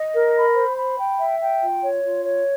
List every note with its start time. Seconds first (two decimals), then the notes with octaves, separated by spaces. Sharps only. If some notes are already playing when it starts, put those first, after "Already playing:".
Already playing: D#5
0.14 A#4
0.35 B5
0.55 C5
0.77 B5
0.98 G5
1.19 E5
1.39 G5
1.61 F4
1.83 C#5
2.03 F4
2.24 C#5